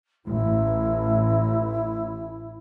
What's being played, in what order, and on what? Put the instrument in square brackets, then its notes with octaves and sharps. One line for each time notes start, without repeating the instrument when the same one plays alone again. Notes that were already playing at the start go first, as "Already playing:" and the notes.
[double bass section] A1 [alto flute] E4